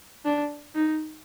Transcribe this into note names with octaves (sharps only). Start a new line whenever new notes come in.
D4
D#4